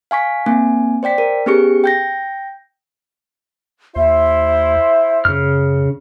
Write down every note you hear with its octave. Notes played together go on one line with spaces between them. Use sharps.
F5 G#5 C#6 B6
A#3 C4 G#5
C5 D5 G5 B6
A#4
B3 C#4 G4 G#4 C#6 C#7
G5 G6 A#6
D#2 E4 C5 E5
F#2 C#3 F6